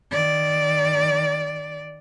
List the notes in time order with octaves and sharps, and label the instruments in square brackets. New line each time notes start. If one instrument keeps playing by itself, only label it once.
[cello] D#3 D5